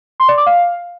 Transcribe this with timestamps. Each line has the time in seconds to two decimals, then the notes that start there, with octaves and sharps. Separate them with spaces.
0.20 C6
0.29 D5
0.37 D6
0.46 F5